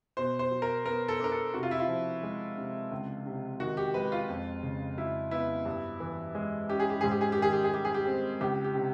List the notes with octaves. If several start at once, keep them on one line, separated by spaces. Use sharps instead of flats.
B2 C5
C5
F#3
A#4
B3 A#4
A4
D4 A#4
A4
C3 F#4
F4
E4
F4
F3
G#3
C3
C#2
C3
D#3 F#4
G4
G#3 B4
F4
F2
C#3
F#3 E4
B3 E4
G2
E3
G#3
C#4 G4
G#4
G4
G#2 G#4
G4
G#4
G4
D#3 G#4
G4
G#4
G3 G4
G#4
G4
C4
C#2 G4
G4
C3